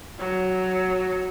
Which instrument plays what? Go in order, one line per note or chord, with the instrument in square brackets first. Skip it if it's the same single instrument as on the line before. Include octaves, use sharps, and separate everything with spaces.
[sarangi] F#3